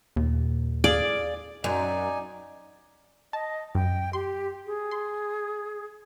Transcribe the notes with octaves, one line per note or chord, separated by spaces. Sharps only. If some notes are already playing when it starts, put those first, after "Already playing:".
D#2 A#2
G#4 D5 F5
F#2 D#4 D5 G#5
D#5 A5
F#2 G5
G4 C6
G#4
C6